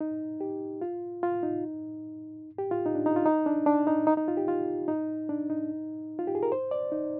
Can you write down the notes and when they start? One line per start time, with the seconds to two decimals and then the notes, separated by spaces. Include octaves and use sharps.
0.01 D#4
0.41 G4
0.81 F4
1.23 F4
1.43 D#4
2.58 G4
2.71 F4
2.86 D#4
2.95 D4
3.06 D#4
3.16 F4
3.26 D#4
3.46 D4
3.66 D4
3.87 D#4
4.07 D#4
4.17 D#4
4.28 F4
4.37 G4
4.48 F4
4.88 D#4
5.29 D4
5.50 D#4
6.19 F4
6.27 G4
6.35 G#4
6.43 A#4
6.52 C5
6.71 D5
6.92 D#4